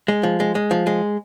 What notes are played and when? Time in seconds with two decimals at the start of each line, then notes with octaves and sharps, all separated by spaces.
0.08 G#3
0.23 F3
0.40 G#3
0.55 G#3
0.71 F3
0.87 G#3